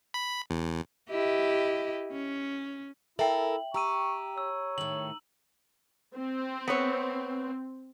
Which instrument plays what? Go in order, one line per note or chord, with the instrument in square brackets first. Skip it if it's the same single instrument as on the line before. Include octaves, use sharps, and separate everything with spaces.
[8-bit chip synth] B5
E2
[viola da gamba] E4 G4 D#5
C#4
[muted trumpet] E4 [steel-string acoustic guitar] A4 A#4 [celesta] E5 G5 [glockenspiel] F#7
[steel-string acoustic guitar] G4 [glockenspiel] A#5 E6 D#7 [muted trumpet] C#6
[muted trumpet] C#5 [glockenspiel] E6
[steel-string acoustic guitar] A2 D#3 [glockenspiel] F#7
[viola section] C4
[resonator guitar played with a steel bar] B3 C#5